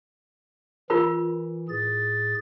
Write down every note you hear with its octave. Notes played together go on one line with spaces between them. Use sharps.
E3 F4 A#4 B5
A2 G#4 A6